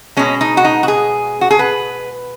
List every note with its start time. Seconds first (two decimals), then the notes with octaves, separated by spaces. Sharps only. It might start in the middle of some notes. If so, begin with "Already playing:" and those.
0.17 B2 G#3 C#4
0.41 D#4
0.57 F#4
0.64 D#4
0.83 F#4
0.88 G#4
1.41 F#4
1.51 G#4
1.59 B4